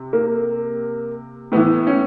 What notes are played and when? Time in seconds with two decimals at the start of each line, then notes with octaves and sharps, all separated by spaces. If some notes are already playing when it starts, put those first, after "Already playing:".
Already playing: C3
0.13 A#3
1.52 A2 E3 B3
1.87 C#4